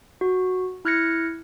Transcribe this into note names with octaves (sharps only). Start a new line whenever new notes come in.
F#4
E4 F6 F#6 G#6 A#6 C#7